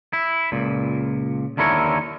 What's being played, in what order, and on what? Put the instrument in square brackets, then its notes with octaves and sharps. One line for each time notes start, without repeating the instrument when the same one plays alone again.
[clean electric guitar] E4
C#2 A#2
D#2 D3 E4 A#4 C#5